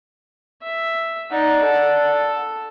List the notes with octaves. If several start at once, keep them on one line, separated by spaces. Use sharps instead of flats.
E5
D#4 D5 F#5
A4